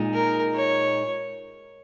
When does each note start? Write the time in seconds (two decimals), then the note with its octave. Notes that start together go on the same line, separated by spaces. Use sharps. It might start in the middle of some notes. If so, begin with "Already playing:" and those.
Already playing: A#2 G#3 D#4
0.13 A#4
0.55 C#5